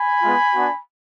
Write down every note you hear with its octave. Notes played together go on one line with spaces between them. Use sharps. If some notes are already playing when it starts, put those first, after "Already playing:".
Already playing: G#5 B5
G#3 B3 F4
B3 D4 F#4